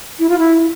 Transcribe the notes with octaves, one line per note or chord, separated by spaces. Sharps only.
E4
F4
E4